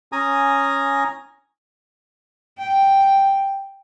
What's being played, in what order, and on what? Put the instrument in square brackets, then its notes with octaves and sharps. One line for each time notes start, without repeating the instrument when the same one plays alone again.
[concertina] C#4 G#5 A#5 D#6
[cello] G5